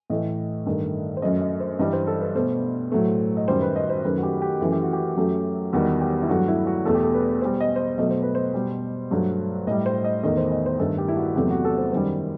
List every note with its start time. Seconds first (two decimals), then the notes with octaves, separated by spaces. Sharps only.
0.10 A2 E3 A3 D#5
0.66 G2 D#3 A3
1.17 C5
1.22 F#2 F#3 A3 D#5
1.42 D#5
1.60 C5
1.79 G2 E3 G3 D#5
1.93 C5
2.07 A4
2.21 B4
2.35 B2 A3 C5
2.92 A2 F#3 A3
3.37 D#5
3.48 F#2 D#3 G3 C5
3.62 B4
3.76 D#5
3.90 C5
4.04 F#2 D#3 A3 B4
4.18 F#4
4.23 G4
4.42 G4
4.61 F#2 E3 A3 A4
4.72 G4
4.83 F#4
4.93 G4
5.16 F#2 F#3 A3
5.73 E2 D#3 G3 F#4
6.01 G4
6.22 E4
6.29 G2 F#3 A3 F#4
6.48 E4
6.67 F#4
6.85 E2 B2 A3 A4
6.94 G4
7.04 A4
7.14 B4
7.41 B2 G3 C5
7.61 D#5
7.76 C5
7.79 D#5
7.98 B2 F#3 A3 D#5
8.10 C5
8.23 B4
8.35 C5
8.54 B2 G3
9.11 G2 F#3 A3
9.67 A2 G3 D#5
9.86 C5
10.04 D#5
10.23 E2 D#3 A3 D#5
10.37 C5
10.52 D#5
10.66 C5
10.80 G2 D#3 A3 A4
10.98 G4
11.08 E4
11.17 F#4
11.36 E2 C3 F#3 A3 G4
11.50 F#4
11.65 A4
11.78 C5
11.92 F#2 D#3 G3 C5